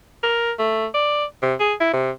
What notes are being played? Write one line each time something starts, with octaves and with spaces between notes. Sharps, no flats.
A#4
A3
D5
C3
G#4
E4
C3